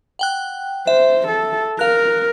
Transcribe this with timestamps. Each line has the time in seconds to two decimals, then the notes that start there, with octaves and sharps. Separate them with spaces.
0.19 F#5 G5 F#6
0.87 C5 E5
1.28 A4
1.79 A#4 F5 F#6